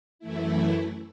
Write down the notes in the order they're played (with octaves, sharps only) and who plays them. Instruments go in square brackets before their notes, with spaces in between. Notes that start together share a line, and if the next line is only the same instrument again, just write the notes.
[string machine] F#2 E3 A3 E4